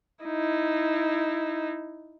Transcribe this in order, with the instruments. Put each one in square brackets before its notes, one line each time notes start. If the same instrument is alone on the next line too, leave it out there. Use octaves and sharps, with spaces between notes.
[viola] D#4 E4